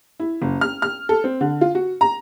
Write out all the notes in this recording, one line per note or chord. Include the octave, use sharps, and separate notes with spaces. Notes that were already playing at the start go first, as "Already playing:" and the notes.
E4
F#1
F6
F6
A4
C4
D3
F4
F#4
A#5